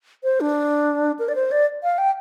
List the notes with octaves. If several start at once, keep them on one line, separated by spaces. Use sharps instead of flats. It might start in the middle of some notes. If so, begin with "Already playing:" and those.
C5
D4
A#4
D5
C5
D5
F5
G5